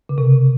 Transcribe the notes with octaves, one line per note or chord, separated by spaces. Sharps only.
C#3
C3